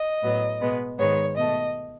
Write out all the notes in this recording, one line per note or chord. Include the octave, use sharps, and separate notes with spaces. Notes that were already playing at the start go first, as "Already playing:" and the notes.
Already playing: D#5
A2 F#3 B3
B2 G#3 B3
G#2 D#3 G#3 B3 C#5
B2 A3 D#5